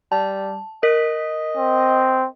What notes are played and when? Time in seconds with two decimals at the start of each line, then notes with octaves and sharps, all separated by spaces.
0.12 G3 A5
0.83 A#4 D#5 B6
1.57 C4